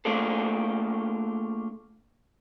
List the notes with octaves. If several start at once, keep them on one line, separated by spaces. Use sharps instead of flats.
A3 A#3 D4 F4 G#4 A4